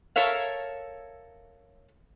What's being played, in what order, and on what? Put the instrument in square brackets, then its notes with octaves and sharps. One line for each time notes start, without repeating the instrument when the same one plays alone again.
[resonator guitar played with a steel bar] A4 A#4 C#5 E5 F5